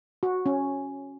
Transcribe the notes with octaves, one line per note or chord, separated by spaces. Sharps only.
F#4
C#4